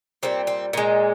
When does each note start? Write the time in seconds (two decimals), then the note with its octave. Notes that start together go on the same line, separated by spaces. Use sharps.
0.23 A#2 G3 C4
0.47 C4
0.73 A#2 G#3